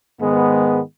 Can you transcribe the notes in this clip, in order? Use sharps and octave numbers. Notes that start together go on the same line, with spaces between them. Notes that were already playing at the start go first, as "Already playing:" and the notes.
G#2 D#3 G#3 B3